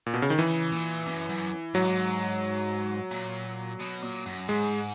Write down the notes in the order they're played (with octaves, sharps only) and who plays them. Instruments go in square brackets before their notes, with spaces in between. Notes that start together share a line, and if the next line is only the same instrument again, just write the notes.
[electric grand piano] A#2
B2
C#3
D#3
[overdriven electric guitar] C#3 [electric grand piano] E3
[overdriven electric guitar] A#2
F#2
F#2
[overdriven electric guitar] G#2 [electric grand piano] F#3
[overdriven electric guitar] A#2
B2
A#2
F#2
[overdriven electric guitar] G#2 [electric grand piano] G#3